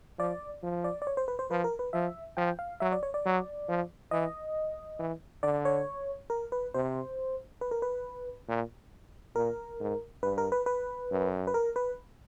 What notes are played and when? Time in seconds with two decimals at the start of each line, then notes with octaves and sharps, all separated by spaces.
0.18 F3 D5
0.63 F3
0.84 D5
1.02 D5
1.07 C#5
1.17 C5
1.28 B4
1.39 C5
1.50 F3 B4
1.64 A#4
1.79 B4
1.93 F3 E5
2.37 F3 G5
2.59 F5
2.80 F#3 E5
2.92 D5
3.03 C#5
3.14 D5
3.25 F#3
3.68 F3
4.11 E3 D#5
4.99 E3
5.43 D3 D5
5.65 C#5
6.30 A#4
6.52 B4
6.74 C3 C5
7.61 B4
7.71 A#4
7.82 B4
8.48 A#2
9.36 A#2 A#4
9.80 G#2
10.23 G2 B4
10.38 A#4
10.52 B4
10.66 B4
11.11 F#2
11.47 B4
11.54 A#4
11.76 B4